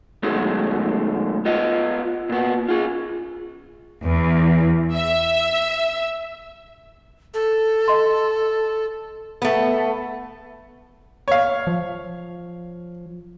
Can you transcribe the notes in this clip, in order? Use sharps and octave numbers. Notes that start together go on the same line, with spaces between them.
B2 D#3 F#3 G#3 A3
B3 F4 D#5
A#2 B3
F4 G#4
E2
E5
A4
D#5 C6
A3 B3
C#5 F5
F3